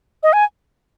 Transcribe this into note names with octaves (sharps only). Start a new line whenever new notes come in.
D#5
G#5